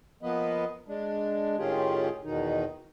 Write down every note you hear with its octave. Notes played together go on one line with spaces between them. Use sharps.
F3 A#3 B3 B4 D#5
G#3 D4
A2 D#3 C#4 F4 G4 G#4
E2 B2 D#3 D#4